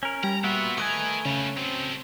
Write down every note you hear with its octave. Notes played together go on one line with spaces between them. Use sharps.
C#4 A#4
G3 A#5
A#3 B3 F4 F#4 E5
A3 A#4 B4 D#5 G#5 G#6
C#3 G3 C#4
F#3 A3 C4